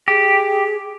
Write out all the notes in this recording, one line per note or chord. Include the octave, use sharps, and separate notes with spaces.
G4 G#4